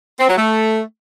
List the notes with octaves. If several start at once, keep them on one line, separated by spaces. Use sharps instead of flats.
C4
F#3
A3